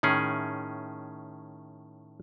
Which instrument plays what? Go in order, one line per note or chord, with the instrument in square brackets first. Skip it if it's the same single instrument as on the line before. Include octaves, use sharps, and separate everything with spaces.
[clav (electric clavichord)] A2 D#3 C#4 G#4